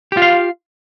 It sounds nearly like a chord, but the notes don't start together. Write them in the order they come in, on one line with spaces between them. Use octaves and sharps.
G4 F4 F5